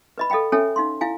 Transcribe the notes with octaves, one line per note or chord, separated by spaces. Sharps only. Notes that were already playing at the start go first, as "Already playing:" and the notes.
B4 D#5 B5
A4 D#5 F5 G5 B5
C#4 A4 C#5 E5 G5 G#5
D#4 F5 C6
E4 F5 G#5